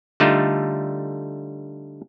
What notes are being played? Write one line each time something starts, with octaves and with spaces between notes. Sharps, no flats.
D3 G3 A3 D#4 F4